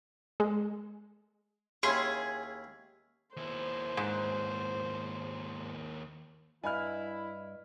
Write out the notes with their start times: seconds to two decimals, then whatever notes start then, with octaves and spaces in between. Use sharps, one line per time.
0.40 G#3
1.83 D#2 C#4 E4 G#4 B5 C6
3.37 D#2 E4 C5
3.97 G#2
6.64 G2 E4 D#5 G#5 B5 F6